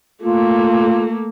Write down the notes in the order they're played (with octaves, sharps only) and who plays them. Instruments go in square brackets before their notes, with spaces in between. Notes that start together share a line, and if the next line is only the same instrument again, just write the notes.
[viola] A3 A#3 [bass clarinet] F4